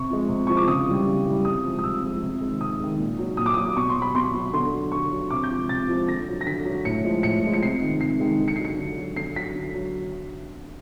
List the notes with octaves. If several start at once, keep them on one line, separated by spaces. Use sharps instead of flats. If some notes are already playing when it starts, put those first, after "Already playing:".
Already playing: C3 C#6
F3 G#3
C3
F3 G#3 C#6
D6
C#3 D#6
E3 G3
C#3
E3 G3
C3 D#6
F3 G#3
D#6
C3 E6
F3 G#3
C3
D#3 G#3
C3 D#6
D#3 G#3
A#2
F#3
A#2 D#6
D6
F#3 D#6
B2 C#6
C6
F#3
B5
B2 C6
F#3
D3 C6
F#3
D3 C#6
F#3
C3 D6
G6
F3 G#3
C3 A6
F3 G#3
D3 A#6
F#3
A#6
D3 B6
F#3
A2 C#7
F3 G#3
A2 C#7
F3 G#3
C#7
C3 C7
D#3 G#3
C3 C7
D#3 G#3
D3
C#7
C7
F#3
C#7
D3
F#3
D3 C7
F#3 B6
D3
F#3